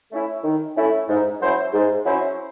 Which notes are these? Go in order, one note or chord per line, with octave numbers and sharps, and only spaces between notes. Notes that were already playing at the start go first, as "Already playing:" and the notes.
A3 C#4 E4
D#3
A3 C#4 E4
G#2
F#3 C#4 E4 C5
G#2
F#3 C#4 E4 C5